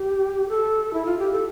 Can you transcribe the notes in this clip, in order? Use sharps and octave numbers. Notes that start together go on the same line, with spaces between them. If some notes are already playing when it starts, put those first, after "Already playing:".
Already playing: G4
A4
E4
F4
G4
A4